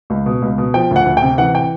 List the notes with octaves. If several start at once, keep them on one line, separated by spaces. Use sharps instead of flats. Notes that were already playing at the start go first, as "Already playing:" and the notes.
C#2
B2
C#2
B2
F3 G5
D2 F#5
D2
G5
C3
E3 F#5
G5